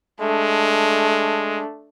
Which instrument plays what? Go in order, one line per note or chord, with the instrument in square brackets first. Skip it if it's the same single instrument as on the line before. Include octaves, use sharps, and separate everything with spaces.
[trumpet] G#3 [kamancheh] A3 D4